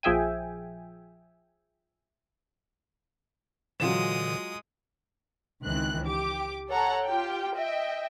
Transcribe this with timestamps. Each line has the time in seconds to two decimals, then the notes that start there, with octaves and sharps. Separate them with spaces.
0.03 A#1 F3 G#4 E5 G5 G#5
3.80 A#2 D3 E3 F#3 G#3 F4 D#6 E7
5.64 C#2 D#3 E3 C4 F#6
6.06 G4 D6
6.69 A4 C#5 F#5 A#5
7.05 F4 G4 G5
7.56 D#5 E5 G5